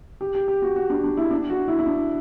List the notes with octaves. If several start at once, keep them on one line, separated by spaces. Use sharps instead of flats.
G4
G4
G4
F#4
F#4
D4
D4
E4
D4
F#4
E4
E4
D4